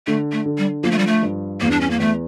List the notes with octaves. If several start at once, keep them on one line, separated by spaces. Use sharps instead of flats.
D3 A3
A3
D3
G3
F3 A#3
A3
G3
A3
G2
E2 A#3
D4
C#4
A#3
E2 A3